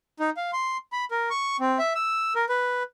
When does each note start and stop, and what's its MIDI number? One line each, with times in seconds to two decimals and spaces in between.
0.20 0.30 63
0.37 0.51 77
0.53 0.77 84
0.92 1.05 83
1.11 1.29 70
1.30 1.57 85
1.60 1.78 60
1.79 1.93 76
1.95 2.33 88
2.35 2.45 70
2.49 2.83 71